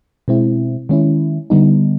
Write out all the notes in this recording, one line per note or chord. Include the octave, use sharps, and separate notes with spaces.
B2 G#3 C4 E4
D#3 G#3 C#4 E4
D3 G3 B3 D#4